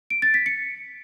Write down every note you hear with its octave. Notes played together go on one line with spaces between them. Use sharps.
D7
A6
B6
C#7